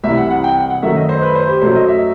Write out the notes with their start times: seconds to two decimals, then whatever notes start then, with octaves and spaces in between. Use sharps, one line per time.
0.04 C2 C3 E3 E5
0.17 F#5
0.30 F#5
0.44 G5
0.57 F#5
0.70 F#5
0.82 F#2 D#3 F#3 A3 E5
0.96 D#5
1.09 C5
1.22 B4
1.35 C5
1.48 G4
1.61 F#2 F#3 A3 C5
1.75 D#5
1.88 E5